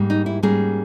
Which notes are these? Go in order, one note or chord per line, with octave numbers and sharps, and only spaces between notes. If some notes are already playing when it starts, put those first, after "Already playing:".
Already playing: G#2 G3 A#3
D#4
E4
G#2 G3 A#3 C#4 G#4